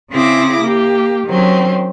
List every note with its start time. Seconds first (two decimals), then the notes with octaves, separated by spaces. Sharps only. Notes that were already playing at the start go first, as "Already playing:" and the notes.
0.12 C#3 C4 E4 G#4 D6 A#6
0.62 A#3 G4
1.26 D#3 F#3 C4 C#4